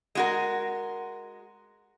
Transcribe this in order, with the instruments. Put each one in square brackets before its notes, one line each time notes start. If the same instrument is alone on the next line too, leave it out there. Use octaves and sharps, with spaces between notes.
[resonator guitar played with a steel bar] G#3 F#4 A#4